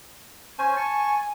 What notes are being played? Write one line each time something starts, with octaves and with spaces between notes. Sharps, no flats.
C#4 C5 G#5
A5 C#6